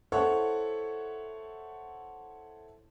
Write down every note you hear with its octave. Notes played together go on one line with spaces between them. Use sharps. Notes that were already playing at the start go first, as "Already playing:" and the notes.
E4 A4 C5 C#5 F#5 C#6